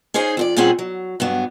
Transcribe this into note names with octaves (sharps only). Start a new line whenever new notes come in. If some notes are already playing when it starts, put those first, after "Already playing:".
C#4 D#4 G#4 C5 G#5
F2 F#4 D5
A#2 G3 C4 C#4 G#4 F#5
F#3
G2 F#3 B3